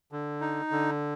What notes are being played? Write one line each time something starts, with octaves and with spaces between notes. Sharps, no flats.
D3
D#4
D3